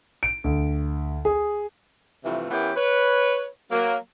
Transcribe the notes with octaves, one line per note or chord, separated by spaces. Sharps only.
D7
D2
G#4
G2 C3 E3 F3 A3
E3 B3 C#4 E4 G4 A#4
B4 C#5
F#3 A#3